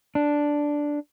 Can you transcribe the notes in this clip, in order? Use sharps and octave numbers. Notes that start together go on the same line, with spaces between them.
D4